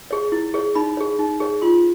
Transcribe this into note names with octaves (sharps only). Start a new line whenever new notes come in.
G#4 C#5
E4
G#4 C#5
D#4 B5
G#4 C#5
D#4
G#4 C#5
F4 C6